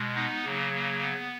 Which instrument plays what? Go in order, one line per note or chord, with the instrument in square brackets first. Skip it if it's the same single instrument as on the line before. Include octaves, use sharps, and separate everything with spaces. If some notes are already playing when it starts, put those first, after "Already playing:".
Already playing: [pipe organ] B2 G#3
B3 D#4
C#3 F#3 A#3
A#3
B3